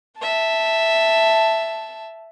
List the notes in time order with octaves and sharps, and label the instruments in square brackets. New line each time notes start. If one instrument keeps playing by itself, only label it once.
[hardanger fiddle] E5 A5